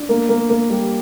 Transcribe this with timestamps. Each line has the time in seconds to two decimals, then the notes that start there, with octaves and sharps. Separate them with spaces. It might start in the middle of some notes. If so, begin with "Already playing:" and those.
Already playing: D4
0.09 A#3
0.29 A#3
0.49 A#3
0.70 G3